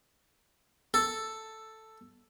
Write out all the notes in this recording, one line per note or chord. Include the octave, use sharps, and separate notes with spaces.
A4